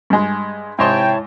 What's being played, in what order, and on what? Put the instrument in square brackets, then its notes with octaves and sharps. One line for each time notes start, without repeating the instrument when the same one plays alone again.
[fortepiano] G2 G#3
[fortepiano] G#2 D#5 C6 [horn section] C3 G5 [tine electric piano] E4 C#5 A5